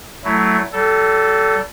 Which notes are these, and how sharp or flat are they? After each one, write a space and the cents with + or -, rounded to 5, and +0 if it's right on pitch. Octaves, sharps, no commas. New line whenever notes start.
F#3 +15 A3 +0 E4 +0
G3 -40 A4 +0